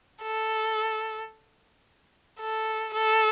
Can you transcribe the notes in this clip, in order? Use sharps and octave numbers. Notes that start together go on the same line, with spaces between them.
A4
A4
A4